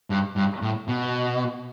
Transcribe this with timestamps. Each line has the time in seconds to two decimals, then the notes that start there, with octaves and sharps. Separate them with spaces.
0.10 G2
0.36 G2
0.62 A2
0.88 B2